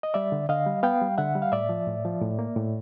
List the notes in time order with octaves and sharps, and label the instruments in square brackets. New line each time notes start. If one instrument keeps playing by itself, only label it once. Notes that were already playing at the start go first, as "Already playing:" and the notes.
[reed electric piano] D#5
G3 D5 E5
D3
D3 D#5 F5
G3
B3 F5 G5
G3
D3 E5 F#5
G3
F5
A2 D5 E5
F3
A2
F3
A2
A#3
A2